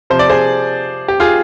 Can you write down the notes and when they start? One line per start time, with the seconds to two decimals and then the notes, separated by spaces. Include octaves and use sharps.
0.10 C3 F3 C5
0.19 D5
0.30 G#4 C5
1.08 G4
1.20 F4 G#4